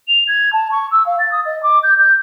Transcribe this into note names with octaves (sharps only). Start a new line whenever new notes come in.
F7
G#6
A5
C#6
E6
F5
A6
D#6
D#5
D6
G6
G6